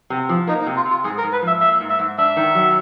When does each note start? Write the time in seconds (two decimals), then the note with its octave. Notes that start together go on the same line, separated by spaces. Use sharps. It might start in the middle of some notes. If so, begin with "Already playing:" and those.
0.10 C3
0.29 F3
0.47 A#3 D#4
0.62 D#4
0.67 C3
0.76 F4
0.85 C3
0.90 F4
1.04 G#2 G#4
1.18 A#4
1.24 G#2
1.32 B4
1.42 F3
1.47 E5
1.61 A#3 E5
1.81 G#2
1.90 E5
1.99 G#2
2.18 D4 E5
2.37 D#3
2.55 F#3